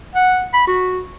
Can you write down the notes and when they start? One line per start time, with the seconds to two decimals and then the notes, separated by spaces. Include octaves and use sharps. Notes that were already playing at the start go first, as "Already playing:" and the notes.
0.15 F#5
0.54 B5
0.67 F#4